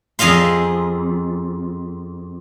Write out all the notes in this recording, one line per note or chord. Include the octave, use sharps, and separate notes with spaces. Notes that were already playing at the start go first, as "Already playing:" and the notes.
F2 G#4 D#5 F5 C6